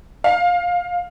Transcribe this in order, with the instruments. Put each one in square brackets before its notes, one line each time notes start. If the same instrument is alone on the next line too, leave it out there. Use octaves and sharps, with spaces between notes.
[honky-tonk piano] F5